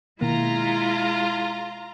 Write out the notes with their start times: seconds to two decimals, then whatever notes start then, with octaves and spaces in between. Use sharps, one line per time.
0.21 B2 D#3 G#3 A#3 E4 F4 A#5